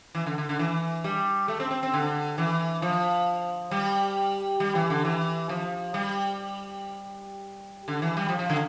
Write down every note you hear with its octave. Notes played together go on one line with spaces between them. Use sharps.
E3
D3
D3
D3
E3
G3
A3
C4
C4
C4
D3
E3
F3
G3
G3
E3
D3
E3
F3
G3
D3
E3
G3
F3
F3
D3